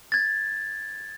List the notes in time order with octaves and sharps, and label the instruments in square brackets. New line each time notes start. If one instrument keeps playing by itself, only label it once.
[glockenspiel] G#6 A6